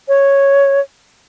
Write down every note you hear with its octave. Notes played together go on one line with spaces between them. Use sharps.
C#5